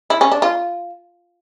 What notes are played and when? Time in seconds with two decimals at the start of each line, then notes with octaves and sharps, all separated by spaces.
0.10 E4
0.21 C#4
0.31 D4
0.42 F4